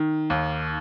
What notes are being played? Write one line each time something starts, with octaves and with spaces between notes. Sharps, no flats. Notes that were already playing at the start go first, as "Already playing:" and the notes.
Already playing: D#3
D#2